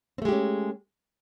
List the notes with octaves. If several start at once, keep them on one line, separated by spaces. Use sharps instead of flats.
G#3 A3 C4 C#4 G4